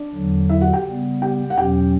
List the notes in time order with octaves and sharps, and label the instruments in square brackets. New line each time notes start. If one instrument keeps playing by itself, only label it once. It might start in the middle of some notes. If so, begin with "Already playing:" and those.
Already playing: [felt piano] D4 D5
[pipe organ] E2 D3 F#3
[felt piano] E4 E5
F#4 F#5
G4 G5
[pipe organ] C#3 G3 B3
[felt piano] G4 G5
F#5
[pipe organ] E2 B2 F#3 C#4 [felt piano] G4 G5